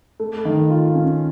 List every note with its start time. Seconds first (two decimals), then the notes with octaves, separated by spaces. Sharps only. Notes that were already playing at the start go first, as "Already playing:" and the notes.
0.20 A3
0.45 D#3
0.70 F4
0.94 C#4